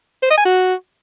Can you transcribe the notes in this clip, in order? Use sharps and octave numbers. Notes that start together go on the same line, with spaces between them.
C5
D#5
G#5
F#4